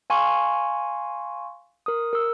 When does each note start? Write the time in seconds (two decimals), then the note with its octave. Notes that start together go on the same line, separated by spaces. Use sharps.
0.10 F5 G#5 C6 C#6
1.86 A#4 D#6
2.13 A#4 E6